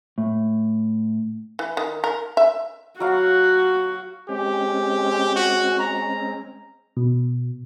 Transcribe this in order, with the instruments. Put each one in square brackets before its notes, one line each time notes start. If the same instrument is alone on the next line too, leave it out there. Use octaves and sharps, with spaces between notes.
[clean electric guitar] A2
[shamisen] E3
D#3
A#4
E5
[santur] F#3 F5 [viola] F#4
[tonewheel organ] G#3 C4 C#4 [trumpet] G4
[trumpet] F#4
A#5
[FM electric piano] B2